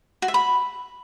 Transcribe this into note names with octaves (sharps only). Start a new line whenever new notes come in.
F#4
E5
B5